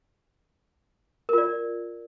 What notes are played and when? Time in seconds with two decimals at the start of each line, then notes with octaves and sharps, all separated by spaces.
1.29 A#4
1.33 F4
1.38 D5